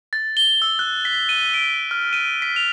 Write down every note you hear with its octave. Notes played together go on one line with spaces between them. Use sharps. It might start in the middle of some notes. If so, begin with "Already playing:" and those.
A6
G7
E6
F#6
B6
D#7
D7
F6
D#7
B6
F7